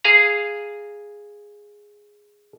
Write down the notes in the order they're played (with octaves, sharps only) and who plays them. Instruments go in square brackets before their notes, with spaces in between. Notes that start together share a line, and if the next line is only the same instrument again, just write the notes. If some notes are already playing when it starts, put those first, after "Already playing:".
[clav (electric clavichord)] G#4 F5 A#5